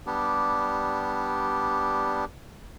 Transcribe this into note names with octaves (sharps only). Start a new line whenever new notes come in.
G3 B3 D4 G4